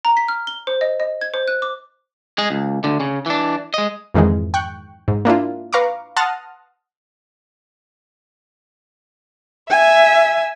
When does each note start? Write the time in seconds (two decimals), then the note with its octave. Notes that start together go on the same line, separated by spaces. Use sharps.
0.05 A#5
0.17 B6
0.28 F6
0.47 G7
0.67 C5
0.81 D#5
1.00 D#5
1.21 G#6
1.34 C5
1.48 F#6
1.62 D6
2.38 G#3 G#4
2.50 C#2
2.84 D2 D3
3.00 C#3
3.26 E3 D4
3.74 G#3 D#5
4.14 F2 G#2 D#3 E3 G#3
4.54 G5 C#6 F#6
5.08 G#2
5.25 A#3 D4 E4 F4
5.73 B4 F5 A#5 C#6 D6
6.16 F#5 A5 C6 D#6 F6 A#6
9.70 E5 G#5